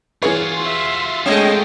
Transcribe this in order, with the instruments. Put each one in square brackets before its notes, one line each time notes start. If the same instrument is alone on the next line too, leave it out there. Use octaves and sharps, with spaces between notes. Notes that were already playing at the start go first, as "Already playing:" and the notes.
[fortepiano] E3 G#4 C#5 [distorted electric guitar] F4 F#4
[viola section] E5 C6
[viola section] G#3 A3 G5 [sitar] C4 D#5